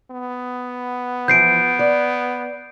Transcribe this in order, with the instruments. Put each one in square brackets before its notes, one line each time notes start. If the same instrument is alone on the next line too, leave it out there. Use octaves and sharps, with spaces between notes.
[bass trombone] B3
[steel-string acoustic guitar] E3 F3 [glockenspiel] G6 C7 D7
[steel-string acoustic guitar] D5